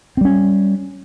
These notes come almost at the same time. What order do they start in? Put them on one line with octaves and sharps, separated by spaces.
C4 G3 C#4